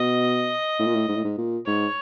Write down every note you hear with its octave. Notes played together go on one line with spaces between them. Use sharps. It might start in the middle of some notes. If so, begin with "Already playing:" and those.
Already playing: B2 D#5
A2
A#2
A2
G#2
A2
G#2
A#2
G#2 C#5